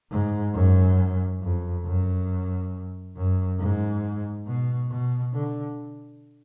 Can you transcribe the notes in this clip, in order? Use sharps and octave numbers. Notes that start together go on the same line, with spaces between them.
G#2
F#2
F2
F#2
F#2
G#2
B2
B2
D3